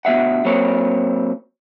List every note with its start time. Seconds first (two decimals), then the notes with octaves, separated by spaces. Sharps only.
0.05 D2 B2 F#3 E5 F#5
0.45 F#3 A#3 C4 C#5